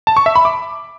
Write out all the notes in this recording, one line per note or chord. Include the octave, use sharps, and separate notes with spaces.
A5
C#6
E5
B5
D6